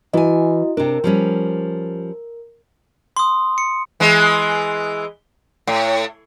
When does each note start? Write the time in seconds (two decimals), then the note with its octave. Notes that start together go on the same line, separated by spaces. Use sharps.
0.13 E3 E4 F#4 D#5 G#5
0.77 C3 D4 A#4
1.04 F3 G3 C#4
3.17 C6 D#6
3.58 C#7
4.00 E3 G#3
5.67 A2